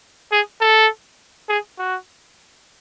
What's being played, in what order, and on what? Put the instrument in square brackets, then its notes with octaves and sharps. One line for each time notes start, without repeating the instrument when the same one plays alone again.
[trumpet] G#4
A4
G#4
F#4